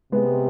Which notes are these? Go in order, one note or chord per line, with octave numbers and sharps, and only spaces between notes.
C3 G#3 B3